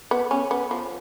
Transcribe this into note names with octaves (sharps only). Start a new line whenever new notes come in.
B3
C#4
B3
F3